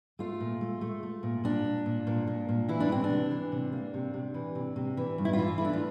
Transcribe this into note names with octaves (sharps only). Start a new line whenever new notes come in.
A3 F4
A#2
A3
A3
A3
A#2
A#2 D4
A#2
A#2
A#2
A#2
A#2
E3 E4
D4
E3 C4
D4
C3
E3
C3
A#3
C3
C3
E3
C3
C3
E3
G2
E4
F4
E3
A3 E4
D4
F4